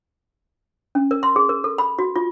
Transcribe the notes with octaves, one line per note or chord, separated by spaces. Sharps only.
C#4
A#4
C6
G#4
A#4
A4
B5
F#4
F4